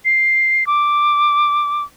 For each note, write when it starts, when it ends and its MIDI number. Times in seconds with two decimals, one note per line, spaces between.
0.05 0.66 96
0.67 1.83 86